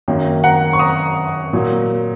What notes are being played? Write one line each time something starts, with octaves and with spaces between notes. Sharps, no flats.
F#2 D#3 F#3 A#3
F#5 A#5
C#6
A#5 D#6
A#2 F#3 A#3